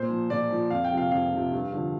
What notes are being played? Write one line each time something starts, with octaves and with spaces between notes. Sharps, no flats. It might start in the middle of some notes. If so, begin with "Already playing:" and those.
Already playing: A#2 C5
F3
A#2 D5
F3
F2 F5
G5
C3 F3
F5
F2 F5
C3 F3
G2
D3 F3